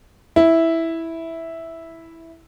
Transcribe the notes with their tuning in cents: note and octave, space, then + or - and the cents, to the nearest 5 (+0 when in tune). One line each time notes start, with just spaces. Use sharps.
E4 -5